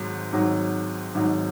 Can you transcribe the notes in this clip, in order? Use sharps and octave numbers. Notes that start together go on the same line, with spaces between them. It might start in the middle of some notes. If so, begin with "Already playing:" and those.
Already playing: G#1 G#2 F#3
G#1 G#2 F#3
G#1 G#2 F#3